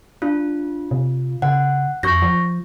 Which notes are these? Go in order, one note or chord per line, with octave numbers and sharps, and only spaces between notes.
D4 F4
C3
C#3 F#5
F2 C#6 G6 A#6
F3